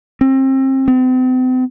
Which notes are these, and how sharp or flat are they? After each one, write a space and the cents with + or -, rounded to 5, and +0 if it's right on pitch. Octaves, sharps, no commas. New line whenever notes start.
C4 +30
C4 -40